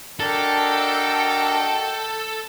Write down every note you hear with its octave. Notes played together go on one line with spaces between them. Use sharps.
D4 F#4 A4 A#4 D#5 G5